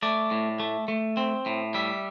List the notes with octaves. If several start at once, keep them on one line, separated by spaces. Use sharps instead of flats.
A3 D5
A2
A3
A3
C4
A2
G3 E5